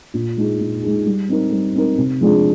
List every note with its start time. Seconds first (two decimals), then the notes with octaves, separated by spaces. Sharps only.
0.14 A#2
0.37 G#3 D#4 G#4
0.60 A#2
0.83 G#3 D#4 G#4
1.06 G3
1.29 C4 D#4 A#4
1.52 G3
1.75 C4 D#4 A#4
1.98 C3
2.21 F3 G#3 D4 G#4